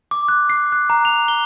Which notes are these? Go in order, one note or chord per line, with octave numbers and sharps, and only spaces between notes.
D6
F#6
C7
F#6
A#5
F7
G7